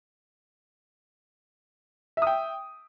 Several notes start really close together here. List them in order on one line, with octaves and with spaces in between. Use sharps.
E5 D#6 G5